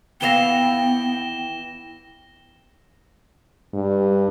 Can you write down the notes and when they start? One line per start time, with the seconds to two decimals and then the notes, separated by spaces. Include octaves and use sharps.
0.21 D#2 E3 B3 F5 G5 A#6 E7 G7
3.74 G2